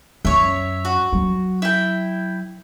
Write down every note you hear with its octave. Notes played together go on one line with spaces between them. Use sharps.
F#2 C#5 E5
F#4
F#3
E4 G5